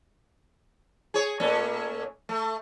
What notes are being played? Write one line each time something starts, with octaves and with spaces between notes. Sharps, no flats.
G#4 C#5
A#2 A3 C#4
A3